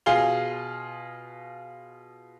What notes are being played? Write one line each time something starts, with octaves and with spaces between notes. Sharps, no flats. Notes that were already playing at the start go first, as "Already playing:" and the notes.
B2 F4 G#4 F5 G7